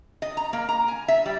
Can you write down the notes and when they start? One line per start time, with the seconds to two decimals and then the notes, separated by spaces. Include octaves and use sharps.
0.22 D#5
0.37 A#5
0.53 A#3
0.69 A#5
0.88 G#5
1.08 E5
1.26 G3